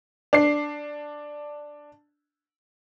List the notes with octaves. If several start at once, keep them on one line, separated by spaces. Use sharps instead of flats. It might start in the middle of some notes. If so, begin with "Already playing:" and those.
D4 C7